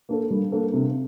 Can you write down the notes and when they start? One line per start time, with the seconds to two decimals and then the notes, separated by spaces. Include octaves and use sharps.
0.09 A#3 D4 A4
0.31 G3
0.52 A#3 D4 A4
0.74 C3